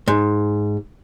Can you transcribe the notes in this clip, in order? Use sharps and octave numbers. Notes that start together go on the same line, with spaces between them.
G#2